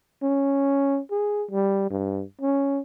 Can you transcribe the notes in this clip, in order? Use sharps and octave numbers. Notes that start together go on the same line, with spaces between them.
C#4
G#4
G3
G2
C#4